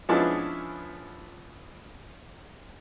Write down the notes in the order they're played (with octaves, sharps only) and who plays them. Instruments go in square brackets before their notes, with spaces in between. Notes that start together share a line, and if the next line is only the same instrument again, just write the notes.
[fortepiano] F3 G#3 B3 C#4 D4 E4